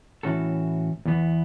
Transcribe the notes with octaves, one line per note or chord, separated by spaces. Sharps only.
A2 E3 C#4 F#4 A4
E2 E3 B3